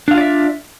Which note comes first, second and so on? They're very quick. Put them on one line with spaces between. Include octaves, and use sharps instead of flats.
D4 F5 F4 D5 E5